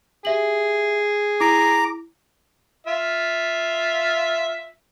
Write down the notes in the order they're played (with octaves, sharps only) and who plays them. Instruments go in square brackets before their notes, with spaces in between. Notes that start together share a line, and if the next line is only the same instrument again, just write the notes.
[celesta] G4 E5 F#7 [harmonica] G#4
[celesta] E4 [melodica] A#5 D6
[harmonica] F4 E5